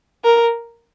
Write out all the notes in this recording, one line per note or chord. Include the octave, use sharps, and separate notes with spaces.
A#4